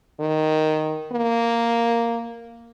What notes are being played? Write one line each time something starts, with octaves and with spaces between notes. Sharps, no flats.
D#3
A#3